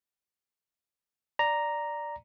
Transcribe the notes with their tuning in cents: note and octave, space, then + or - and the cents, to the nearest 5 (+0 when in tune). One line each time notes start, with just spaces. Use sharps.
D5 +0 A#5 +0